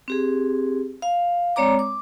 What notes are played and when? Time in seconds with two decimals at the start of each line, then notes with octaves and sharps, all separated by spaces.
0.08 C4 G4 G#4
1.02 F5
1.56 G#3 C4 C#5 D5 A#5 D6
1.79 D6